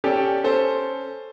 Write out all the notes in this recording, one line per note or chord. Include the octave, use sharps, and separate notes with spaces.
C#4 G4 A4 D5
C#4 A4 C5